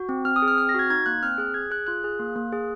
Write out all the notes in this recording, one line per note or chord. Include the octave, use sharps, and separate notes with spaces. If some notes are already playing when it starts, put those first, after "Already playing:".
Already playing: F#4
C4
C4 F6
D#6
G#4
F6
C4 F6
A#6
F#4 G#6
D#4 G#6
A#3 F#6
C4 F6
G#4 F#6
G#4 G#6
G#4 F#6
F4 F#6
G#4
A#3
A#3
G#4